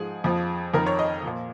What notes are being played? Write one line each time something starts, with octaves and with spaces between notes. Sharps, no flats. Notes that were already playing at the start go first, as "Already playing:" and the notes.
Already playing: G#2 F3 G#4
F2 F3
F2 D#3 A#4
C#5
D#5
A#2 F3